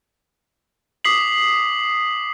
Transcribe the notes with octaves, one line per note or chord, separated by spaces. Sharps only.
D6 D#6 B6 C7 F#7